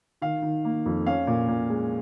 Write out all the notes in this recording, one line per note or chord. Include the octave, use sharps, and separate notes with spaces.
D#3 F5
D#3
A#3
F2
C#4 F5
A#2
A#2
G#3